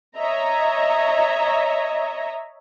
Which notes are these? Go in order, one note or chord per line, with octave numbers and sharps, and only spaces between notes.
C#5 D#5 E5 A#5